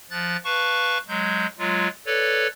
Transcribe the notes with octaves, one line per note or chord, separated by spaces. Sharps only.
F3 F#6 A6
B4 F5 A5 C#6
F#3 G#3 G6
F#3 G#3 F4
A4 B4 C#5 D5